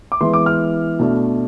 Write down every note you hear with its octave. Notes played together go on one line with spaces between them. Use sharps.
D6
E3 G#3 B3 E4 C6
D6
F6
B2 A3 D4